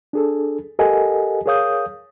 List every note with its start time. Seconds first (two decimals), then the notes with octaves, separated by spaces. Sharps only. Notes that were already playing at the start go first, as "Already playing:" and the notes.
0.13 D4 G#4 A4
0.79 G4 A4 A#4 D#5 F#5 G#5
1.46 G#4 A#4 C#5 F5 D#6 G6